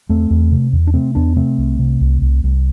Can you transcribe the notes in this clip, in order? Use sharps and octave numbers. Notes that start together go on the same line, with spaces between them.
E2 A3 C4
E2
C3
E2
D4
C3 A3 C4
E2 B3 D4
C3 A3 C4
C2
C3
C2
C2
C2